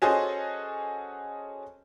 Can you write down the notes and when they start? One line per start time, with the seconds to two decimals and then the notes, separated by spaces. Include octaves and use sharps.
0.02 C#4 F#4 G#4 A4 C5 D#5